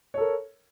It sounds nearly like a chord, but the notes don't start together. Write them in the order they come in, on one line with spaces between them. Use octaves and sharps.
C#5 A4 A#4